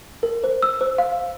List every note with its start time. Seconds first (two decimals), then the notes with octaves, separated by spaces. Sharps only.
0.23 A#4
0.44 C5
0.63 E6
0.81 C5
0.98 F5